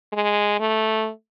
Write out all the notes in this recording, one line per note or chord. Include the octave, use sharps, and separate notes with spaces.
G#3
A3